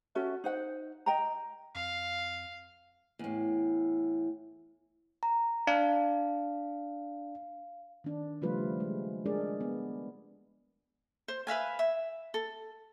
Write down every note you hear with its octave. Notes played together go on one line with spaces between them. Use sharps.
C#4 F#4 A4 E5
D#4 C5 F#5
D#5 G5 A#5
F2 F5
E2 A2
A#5
D4 F5
D#3 D4
C#3 F3 G3 A3 F4 B4
G#3
G#3 D4 G#4 A#4 D5
B3
C5
B4 E5 F5 G#5
E5
A4